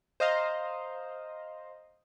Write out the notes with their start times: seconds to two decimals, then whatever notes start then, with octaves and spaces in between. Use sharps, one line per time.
0.20 C5 D#5 F5 A#5